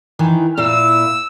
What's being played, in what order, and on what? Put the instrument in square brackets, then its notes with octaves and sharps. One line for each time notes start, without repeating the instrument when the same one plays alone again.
[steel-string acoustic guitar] D#3 E3 D#4
[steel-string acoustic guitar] A#2 E4 F5 [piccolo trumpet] E6